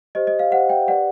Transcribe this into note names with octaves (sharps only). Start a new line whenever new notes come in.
G4 C5 D#5
D#5
F5
G4 C5 F#5
G5
G4 B4 D5 F#5